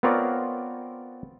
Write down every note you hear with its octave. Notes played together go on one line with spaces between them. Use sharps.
B3 C4 F4 A#4 C#5 D5